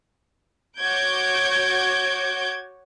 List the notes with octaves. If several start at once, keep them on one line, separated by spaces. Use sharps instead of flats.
F#4 C#5 D6 G6 G#6 D7